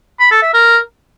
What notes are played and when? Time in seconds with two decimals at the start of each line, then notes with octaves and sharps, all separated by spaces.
0.20 B5
0.31 A4
0.42 E5
0.54 A#4